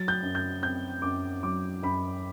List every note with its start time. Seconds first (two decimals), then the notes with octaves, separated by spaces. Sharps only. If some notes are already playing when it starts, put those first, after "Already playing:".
Already playing: F#3 A6
0.08 G6
0.23 F#2
0.35 G6
0.62 C4 G6
1.02 F#2 D6
1.43 F#3 D6
1.82 F#2 B5